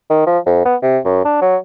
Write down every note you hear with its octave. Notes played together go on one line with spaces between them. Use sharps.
D#3
F3
F2
B3
C3
F#2
D4
F#3